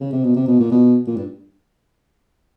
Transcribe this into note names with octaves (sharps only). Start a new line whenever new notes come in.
C#3
C3
B2
C3
B2
A#2
B2
A#2
G2